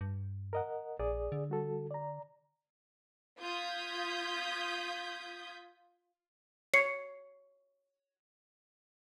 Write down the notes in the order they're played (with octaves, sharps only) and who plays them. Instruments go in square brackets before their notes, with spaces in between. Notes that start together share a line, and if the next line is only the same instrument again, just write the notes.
[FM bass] G2
[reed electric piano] A#4 D#5 F#5
[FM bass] A#1 [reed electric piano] G#4 D5 D#6
[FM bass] D3
[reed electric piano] G3 F#4 A4
D5 A#5
[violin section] F4 D#6 G6 G#6 B6
[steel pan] C#5 [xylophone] C7 C#7